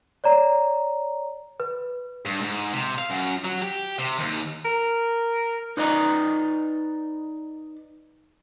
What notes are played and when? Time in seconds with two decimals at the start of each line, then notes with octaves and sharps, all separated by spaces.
0.24 C#5 D5 A#5
1.60 B4
2.25 G2
2.41 G#2
2.73 C3
2.98 F5
3.10 F#2
3.44 F#3
3.62 G4
3.99 C3
4.19 D#2
4.65 A#4
5.77 D#4 B4 D5 D#5 A#5